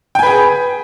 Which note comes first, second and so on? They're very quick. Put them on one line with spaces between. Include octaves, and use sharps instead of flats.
G5 G#5 B4 G#4